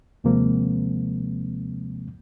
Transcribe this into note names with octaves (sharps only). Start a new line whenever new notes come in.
D#2 C3 F3 G#3 A#3 C4